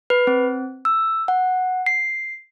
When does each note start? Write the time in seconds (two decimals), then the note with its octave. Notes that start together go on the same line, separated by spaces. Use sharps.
0.10 B4
0.27 C4
0.85 E6
1.28 F#5
1.86 C7